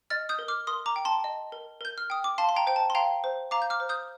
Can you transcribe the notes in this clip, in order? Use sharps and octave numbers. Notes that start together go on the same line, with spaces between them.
D#5 F6 A6
D#6 G6
A#4
D6 F6
A#4 C6 D#6
A#5 D6
G5
A5 C6
D#5
A#4
A#4 G6
F6
G5 D#6
D6
F5 A5 C6
C6
G5 A#5
C5 G5
A5
C6
F5 G5 A#5
C5
F5 A#5 D6
G6
D6 F6
C5
D#6 G6